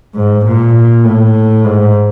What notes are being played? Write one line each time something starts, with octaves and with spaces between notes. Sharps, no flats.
G#2
A#2
A2
G#2